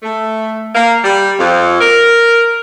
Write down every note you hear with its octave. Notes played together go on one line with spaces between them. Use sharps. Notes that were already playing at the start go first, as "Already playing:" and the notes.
A3
A#3
G3
F2
A#4